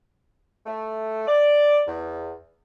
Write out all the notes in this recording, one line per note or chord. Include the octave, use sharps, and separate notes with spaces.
A3
D5
E2